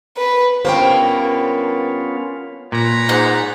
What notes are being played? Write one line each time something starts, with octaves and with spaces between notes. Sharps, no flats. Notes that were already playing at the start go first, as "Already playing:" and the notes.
B4
G2 A#3 B3 C#4 F4 C5 C#5 G5
A#2 B4 C#5 A#5
G#2 F#5